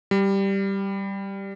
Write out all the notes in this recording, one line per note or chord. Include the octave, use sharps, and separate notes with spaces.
G3